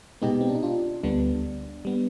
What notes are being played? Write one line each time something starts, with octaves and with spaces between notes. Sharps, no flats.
B2 G#3 B3 D#4 G4
C4
D4
D#4
D4 F4
D2 D3 G3 B3 D4
G3 B3